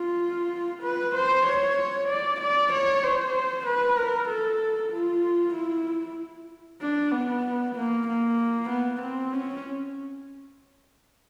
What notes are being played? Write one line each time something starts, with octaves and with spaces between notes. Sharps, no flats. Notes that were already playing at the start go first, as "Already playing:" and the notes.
Already playing: F4
B4
C5
C#5
D5
D5
C#5
C5
B4
A#4
A4
F4
E4
D4
B3
A#3
A#3
B3
C4
C#4